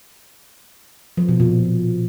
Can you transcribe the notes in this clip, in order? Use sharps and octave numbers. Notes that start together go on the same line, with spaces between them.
F3
B2
A#2